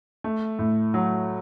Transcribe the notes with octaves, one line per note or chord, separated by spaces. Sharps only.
A3
A2
F#3